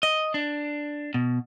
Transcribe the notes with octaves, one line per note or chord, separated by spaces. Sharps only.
D#5
D4
B2